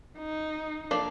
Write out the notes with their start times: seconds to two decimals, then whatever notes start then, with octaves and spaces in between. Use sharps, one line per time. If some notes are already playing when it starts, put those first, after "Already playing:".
0.18 D#4
0.91 F3 A#3 D4 A4 D5